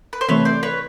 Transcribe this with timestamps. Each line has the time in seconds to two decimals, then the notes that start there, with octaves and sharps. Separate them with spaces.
0.13 B4
0.21 C5
0.29 C3 E3 A3 B4 C#5
0.45 C5 D5
0.63 B4 C#5